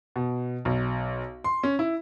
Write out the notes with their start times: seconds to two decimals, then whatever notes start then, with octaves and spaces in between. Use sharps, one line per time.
0.16 B2
0.65 B1
1.44 C6
1.63 C#4
1.79 E4